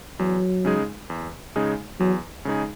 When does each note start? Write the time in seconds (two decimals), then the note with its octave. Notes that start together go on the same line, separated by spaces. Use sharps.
0.19 E2 F#3
0.65 C#3 G#3 D#4 G#4
1.10 E2
1.56 C#3 G#3 D#4 G#4
2.00 E2 F#3
2.45 C#3 G#3 D#4 G#4